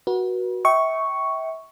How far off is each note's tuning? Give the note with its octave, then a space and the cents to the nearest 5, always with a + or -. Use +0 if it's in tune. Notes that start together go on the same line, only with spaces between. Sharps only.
F#4 +0 B4 -40
E5 -30 G5 -20 C#6 +0